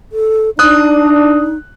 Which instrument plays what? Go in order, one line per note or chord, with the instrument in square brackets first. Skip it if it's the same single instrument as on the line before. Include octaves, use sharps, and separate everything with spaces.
[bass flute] A4
[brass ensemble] D4 [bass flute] D#4 [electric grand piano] D#6 F#6